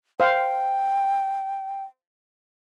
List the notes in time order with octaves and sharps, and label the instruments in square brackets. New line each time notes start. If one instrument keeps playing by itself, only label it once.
[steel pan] C5 F5 [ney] G5